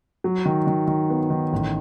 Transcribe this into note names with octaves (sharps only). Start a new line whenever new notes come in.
F#3
D#3
D#3
D#3
B3
D#3
A1